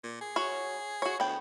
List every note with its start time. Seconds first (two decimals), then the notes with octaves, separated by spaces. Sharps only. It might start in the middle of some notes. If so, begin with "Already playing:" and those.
0.03 A#2
0.21 G#4
0.36 F#4 C#5
1.02 F#4 C#5
1.20 D2 B3 G5